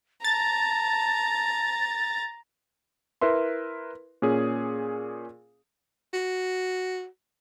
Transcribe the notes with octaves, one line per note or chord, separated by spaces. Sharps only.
A5 A#5 A6
E4 A#4 B4 E5 C6
A#2 C#4 G#4
F#4